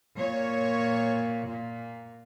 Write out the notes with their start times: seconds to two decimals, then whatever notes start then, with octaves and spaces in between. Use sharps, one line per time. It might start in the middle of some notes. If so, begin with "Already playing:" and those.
0.17 A#2 C#5
1.49 A#2